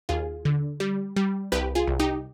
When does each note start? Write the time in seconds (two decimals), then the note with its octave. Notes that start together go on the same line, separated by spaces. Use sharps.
0.09 D#2 F4 G#4
0.45 D3
0.80 G3
1.16 G3
1.52 C2 G4 B4
1.75 F4 G#4
1.87 C2
1.99 D#4 G4